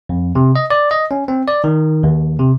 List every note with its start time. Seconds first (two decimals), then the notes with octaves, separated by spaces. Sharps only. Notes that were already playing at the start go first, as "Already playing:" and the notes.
0.09 F2
0.35 C3
0.56 D#5
0.70 D5
0.91 D#5
1.11 C#4
1.28 C4
1.48 D5
1.64 D#3
2.03 D#2
2.39 C3